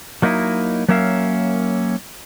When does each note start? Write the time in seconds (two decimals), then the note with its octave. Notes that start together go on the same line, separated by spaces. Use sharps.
0.22 F#3 A#3 D#4 E4 D#5
0.89 F#3 A#3 C#4 A#4 E5 F5